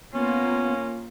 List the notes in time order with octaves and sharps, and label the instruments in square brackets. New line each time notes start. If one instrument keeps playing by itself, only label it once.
[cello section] A#3 F4 [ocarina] B3 [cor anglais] C#4